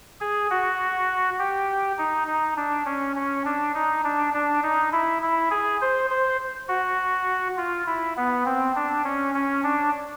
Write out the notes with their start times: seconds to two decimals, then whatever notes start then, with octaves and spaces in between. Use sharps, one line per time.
0.21 G#4
0.50 F#4
1.39 G4
1.98 D#4
2.28 D#4
2.57 D4
2.86 C#4
3.16 C#4
3.45 D4
3.75 D#4
4.04 D4
4.34 D4
4.63 D#4
4.93 E4
5.22 E4
5.51 G#4
5.81 C5
6.10 C5
6.69 F#4
7.57 F4
7.87 E4
8.17 B3
8.46 C4
8.76 D4
9.04 C#4
9.34 C#4
9.64 D4